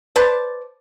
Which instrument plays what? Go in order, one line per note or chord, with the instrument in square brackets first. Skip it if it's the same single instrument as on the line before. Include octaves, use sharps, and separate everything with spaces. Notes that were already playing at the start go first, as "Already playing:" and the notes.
[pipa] B4 C5 D5 A5